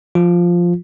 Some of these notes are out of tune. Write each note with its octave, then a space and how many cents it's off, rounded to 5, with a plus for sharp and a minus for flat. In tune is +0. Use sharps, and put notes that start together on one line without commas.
F3 +0 F4 +0